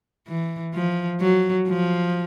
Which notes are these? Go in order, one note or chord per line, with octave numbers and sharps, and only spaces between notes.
E3
F3
F#3
F3